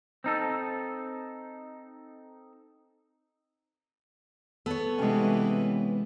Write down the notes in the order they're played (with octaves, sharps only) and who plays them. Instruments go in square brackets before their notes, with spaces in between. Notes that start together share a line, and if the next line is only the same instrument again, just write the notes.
[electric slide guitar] C4 D#4 A4
[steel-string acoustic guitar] B3 C#5 [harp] A4
[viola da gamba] C3 E3 [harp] G#3 C#4